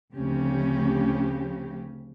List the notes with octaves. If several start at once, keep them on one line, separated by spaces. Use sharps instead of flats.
D2 C#3 F3 C4 C#4 G4